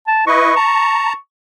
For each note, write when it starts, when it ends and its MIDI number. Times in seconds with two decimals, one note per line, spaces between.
0.07 0.26 81
0.27 0.55 64
0.27 0.55 71
0.27 0.55 75
0.27 1.16 85
0.56 1.13 81
0.56 1.13 82